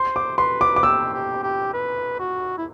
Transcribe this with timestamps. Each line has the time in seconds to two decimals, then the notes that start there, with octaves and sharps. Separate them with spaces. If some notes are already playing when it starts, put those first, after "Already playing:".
Already playing: C5 C6
0.16 D6
0.38 B4 C6
0.61 D6
0.76 D6
0.83 G4 E6
1.14 G4
1.43 G4
1.74 B4
2.20 F#4
2.58 E4